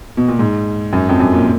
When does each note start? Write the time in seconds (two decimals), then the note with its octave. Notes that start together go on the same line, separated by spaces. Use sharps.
0.17 B2
0.28 A#2
0.39 G#2
0.93 F#2
1.09 F2
1.20 F#2
1.33 A#2